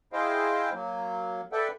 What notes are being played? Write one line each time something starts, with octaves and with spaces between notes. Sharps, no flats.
E4 G#4 C5 D#5 F5 G5
F#3 A#3
A4 B4 D5 E5 F#5 G5